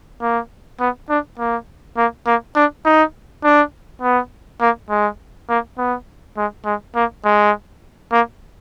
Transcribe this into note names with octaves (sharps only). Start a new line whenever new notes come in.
A#3
B3
D4
A#3
A#3
A#3
D4
D#4
D4
B3
A#3
G#3
A#3
B3
G#3
G#3
A#3
G#3
A#3